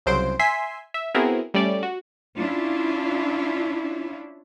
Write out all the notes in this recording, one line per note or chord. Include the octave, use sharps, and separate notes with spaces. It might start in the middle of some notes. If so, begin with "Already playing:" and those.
C2 C#3 F#3 C5 C6 D7
E5 G#5 C6 B6 C7
E5
B3 C4 E4 F#4 G#4 A#4
G3 A3 C#4 D5
F#4
C#4 D4 E4 F4